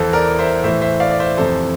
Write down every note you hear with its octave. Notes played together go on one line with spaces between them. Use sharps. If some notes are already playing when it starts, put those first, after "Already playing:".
Already playing: E2 E3 A4 C5
A#4 D5
C5 E5
A2 E3 C5 E5
C5 E5
D5 F5
D5
C5 E5
F2 C3 E3 A4 C5